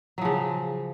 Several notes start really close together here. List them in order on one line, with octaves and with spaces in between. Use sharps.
F#3 F3 C#3